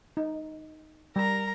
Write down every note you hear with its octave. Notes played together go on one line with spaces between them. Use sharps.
D#4
G3 A#4 A#5